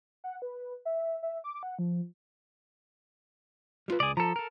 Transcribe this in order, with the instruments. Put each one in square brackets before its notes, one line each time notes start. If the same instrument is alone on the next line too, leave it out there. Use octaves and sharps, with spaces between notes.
[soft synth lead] F#5
B4
E5
E5
D6
F#5
F3
[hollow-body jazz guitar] G3 F4 B4
[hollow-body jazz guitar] C#2 [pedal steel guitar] G#4 D5
[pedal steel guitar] F3 A4 [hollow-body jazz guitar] A#5
[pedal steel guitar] A4 A#4